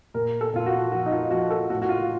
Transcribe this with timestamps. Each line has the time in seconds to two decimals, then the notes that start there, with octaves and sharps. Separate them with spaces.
0.14 A#2 A#4
0.41 A4
0.53 A#2 F4
0.66 F#4
0.92 F3 F#4
1.06 D#4
1.12 F4
1.31 F3 F#4
1.50 A4
1.70 A2 F#4
1.82 F#4
1.89 F4